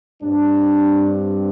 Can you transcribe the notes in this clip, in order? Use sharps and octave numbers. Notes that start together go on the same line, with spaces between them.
G2 G3 C4 D4